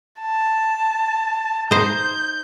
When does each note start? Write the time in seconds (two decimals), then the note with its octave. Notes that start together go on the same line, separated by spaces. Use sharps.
0.21 A5
1.71 D#4 C5 G6